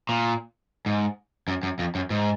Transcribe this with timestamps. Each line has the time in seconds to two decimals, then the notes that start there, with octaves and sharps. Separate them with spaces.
0.09 A#2
0.86 G#2
1.48 F#2
1.63 F#2
1.79 F2
1.95 F#2
2.10 G#2